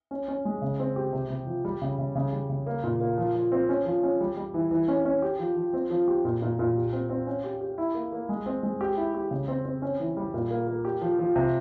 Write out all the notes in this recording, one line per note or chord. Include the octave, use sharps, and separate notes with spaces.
C#4
C#4
G#3
C#3
C4
G4
C3
C3
F3
G3
C#3
C#3
C#3
G3
C#3
A#3
A#2
A#3
F3
F3
C4
C#4
F3
C#4
G3
G3
E3
E3
C#4
C#4
G4
F3
F3
C4
F3
G4
A#2
A#2
A#2
G4
C4
C4
C#4
G4
G4
E4
A#3
A#3
G#3
C4
G#3
G4
E4
G4
C#3
C4
C4
C#4
E3
G3
A#2
A#3
A#3
G4
F3
F3
C3